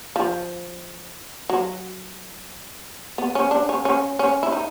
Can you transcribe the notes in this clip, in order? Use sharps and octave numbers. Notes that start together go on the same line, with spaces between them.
F3
F#3
B3
C#4
D4
C#4
C#4
C#4
E4
D#4